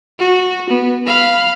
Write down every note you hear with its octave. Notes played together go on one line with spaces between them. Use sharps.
F#4
B3
F5 B5